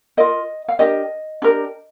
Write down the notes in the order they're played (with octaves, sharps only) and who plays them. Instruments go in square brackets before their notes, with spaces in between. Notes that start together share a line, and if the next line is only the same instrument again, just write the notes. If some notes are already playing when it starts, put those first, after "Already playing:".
[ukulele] F4 A#4 D#5
F5
D4 G4 A#4 D#5
D4 G4 A#4